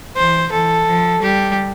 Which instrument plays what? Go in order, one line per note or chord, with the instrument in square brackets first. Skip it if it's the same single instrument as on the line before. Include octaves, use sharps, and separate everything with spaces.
[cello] E3 [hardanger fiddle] C5
[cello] E3 [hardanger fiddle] A4
[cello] F3
[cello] G3 [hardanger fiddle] G4